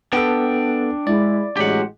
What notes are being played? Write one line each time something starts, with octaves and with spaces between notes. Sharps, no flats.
B3 D4 A4 G5
G#3 E4 D5
A1 F#3 G#3 G4 F#5